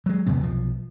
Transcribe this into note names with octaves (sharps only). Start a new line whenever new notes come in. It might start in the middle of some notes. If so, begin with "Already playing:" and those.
F#3 G#3
G1 E2 C3 B3
B1 F3